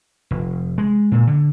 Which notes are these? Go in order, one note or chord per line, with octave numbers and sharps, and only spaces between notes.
F1
G#3
A#2
D3